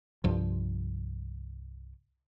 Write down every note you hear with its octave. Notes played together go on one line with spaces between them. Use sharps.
C2 G2 F3